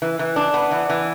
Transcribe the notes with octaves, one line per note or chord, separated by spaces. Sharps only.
E3
E3
D4
B3
E3
E3